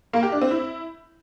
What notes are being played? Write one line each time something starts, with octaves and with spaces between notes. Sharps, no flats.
A#3
G4
D4
C4
E4